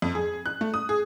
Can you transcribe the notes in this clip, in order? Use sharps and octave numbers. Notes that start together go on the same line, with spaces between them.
F2
G#4
F#6
A3
D#6
G#4